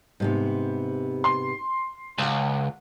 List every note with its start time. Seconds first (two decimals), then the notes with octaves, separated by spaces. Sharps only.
0.20 G#2 C3 B3
1.24 C6
2.18 C#2 F5 F#5